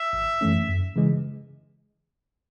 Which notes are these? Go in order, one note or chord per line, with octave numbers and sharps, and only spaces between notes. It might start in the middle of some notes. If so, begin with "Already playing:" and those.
Already playing: E5
G#1
F#2 E3 A3 C#4
F#2
C#3 E3 G#3